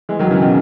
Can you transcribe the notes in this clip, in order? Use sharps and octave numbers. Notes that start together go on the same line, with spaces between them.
E3 G#3
D#3 F#3
C#3 E3
B2 D#3